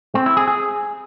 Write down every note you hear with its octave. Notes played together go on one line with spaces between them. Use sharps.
C4
E4
G#4
G#4